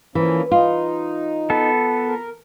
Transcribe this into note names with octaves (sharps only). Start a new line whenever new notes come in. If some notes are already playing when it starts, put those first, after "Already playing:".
E3 F3 A#3 C#4
D#4 F4
B3 A4
A#4